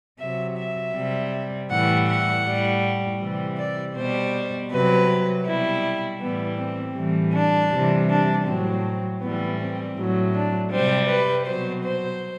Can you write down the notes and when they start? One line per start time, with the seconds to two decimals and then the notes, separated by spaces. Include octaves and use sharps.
0.20 C3 F#3 E5
0.58 E5
0.95 C3 G3
1.70 A2 E3 G3 F#5
2.08 F#5
2.46 A2 G3
3.20 C3 E3 G3
3.58 D5
3.96 B2 G3 C5
4.71 C3 F#3 B4
5.46 B2 G3 E4
6.21 A2 E3 G3 B3
6.58 C4
6.96 A2 E3 G3
7.34 D4
7.71 C3 E3 G3
8.09 D4
8.46 A2 F#3 C4
9.21 A2 E3 G3 B3
9.59 C4
9.97 A2 F#3
10.34 D4
10.72 C3 G3 C5
11.09 B4
11.46 B2 F#3 C5
11.84 C5